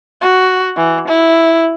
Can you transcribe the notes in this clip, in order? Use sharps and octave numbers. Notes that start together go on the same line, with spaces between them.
F#4
E3
E4